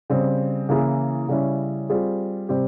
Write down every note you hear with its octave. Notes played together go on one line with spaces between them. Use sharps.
C#3 G3 C4
C#3 E3 A#3 E4 G#4
C#3 G3 C#4 E4
G3 C4 F4 G#4
C3 G3 C4 G4